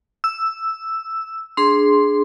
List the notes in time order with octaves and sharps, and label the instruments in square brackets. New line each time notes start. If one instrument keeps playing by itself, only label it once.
[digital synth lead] E6
[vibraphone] D4 G#4 [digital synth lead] C6